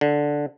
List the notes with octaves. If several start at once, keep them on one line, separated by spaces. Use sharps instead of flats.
D3